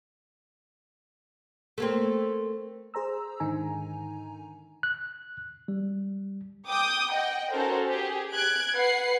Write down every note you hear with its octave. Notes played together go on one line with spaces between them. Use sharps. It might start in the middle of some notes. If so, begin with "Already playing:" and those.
A3 A#3 C4
G#4 C5 A#5 E6
G#2 D3 D#3 D#4 G#5 A#5
F#6
G3
G5 D6 D#6 G6
D#5 F#5 G5
C#4 D#4 F#4 A4 A#4 C5
G4 G#4
F#6 G#6 D7
B4 F#5 C7